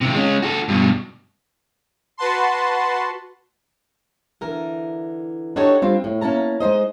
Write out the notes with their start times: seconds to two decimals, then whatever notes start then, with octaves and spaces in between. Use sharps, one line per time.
0.01 C3 D#3
0.14 G#3 C#4
0.42 F#4 A4
0.68 G2 B2
2.17 F#4 B4 F#5 A5 C6
4.41 D3 E3 A#4
5.56 D4 D#4 F#4 G4 A4 C#5
5.82 G3 C4 D4 F4
6.04 A2
6.21 A#3 C#4 E4 A5 A#5
6.60 G#3 D#4 C5 D#5